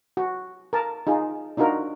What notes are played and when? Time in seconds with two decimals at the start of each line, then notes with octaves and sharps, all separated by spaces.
0.17 F#4
0.73 A#4 A5
1.07 D#4 F4 G#4
1.57 D4 D#4 F4 F#4 A#4